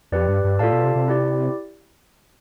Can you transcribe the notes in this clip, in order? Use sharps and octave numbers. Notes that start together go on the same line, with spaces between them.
F2 G4 B4 D5
G2
G2
A2 F4 A4 D5 F5 A5
B2
C3
C3
E4 G4 D5